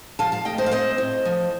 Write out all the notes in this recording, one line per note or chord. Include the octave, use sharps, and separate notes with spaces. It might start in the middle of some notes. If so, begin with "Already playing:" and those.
F3 F5 A5
F5 A5
A3 D#5 G5
C5 D#5
F5
C4 C5 D#5
A2
F3